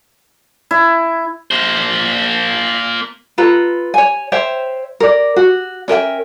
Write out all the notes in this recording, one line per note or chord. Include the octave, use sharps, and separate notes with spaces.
E4
A#3 C5
F4 A4 B4 A#5
C#5 G#5
C5 C#5 E5 G5
A#4 D5
F#4
C#4 A#4 E5 G5